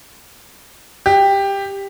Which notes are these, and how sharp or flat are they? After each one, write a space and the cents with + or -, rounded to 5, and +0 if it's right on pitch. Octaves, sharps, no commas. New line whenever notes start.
G4 +10